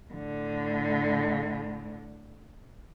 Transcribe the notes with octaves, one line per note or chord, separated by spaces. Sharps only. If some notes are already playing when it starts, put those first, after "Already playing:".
A2 D3